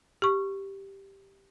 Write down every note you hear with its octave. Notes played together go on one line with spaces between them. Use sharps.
G4 C#6